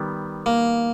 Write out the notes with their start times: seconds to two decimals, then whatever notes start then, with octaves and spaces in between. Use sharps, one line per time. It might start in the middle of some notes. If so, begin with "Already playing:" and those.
Already playing: D#3 G3 B3
0.46 A#3